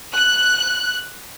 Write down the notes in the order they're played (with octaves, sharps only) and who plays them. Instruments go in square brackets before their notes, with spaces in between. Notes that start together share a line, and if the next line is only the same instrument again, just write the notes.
[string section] F#6